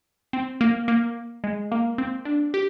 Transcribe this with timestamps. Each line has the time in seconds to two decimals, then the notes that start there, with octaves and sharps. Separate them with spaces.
0.33 C4
0.61 A#3
0.88 A#3
1.44 G#3
1.72 A#3
1.98 C4
2.25 D4
2.54 G4